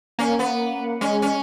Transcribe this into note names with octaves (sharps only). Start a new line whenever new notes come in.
A#3 C#4
B3
G#3 C#4
C#4